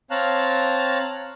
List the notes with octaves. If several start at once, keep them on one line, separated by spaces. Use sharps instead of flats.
C4 C#5 F5 A5 A#5 F#6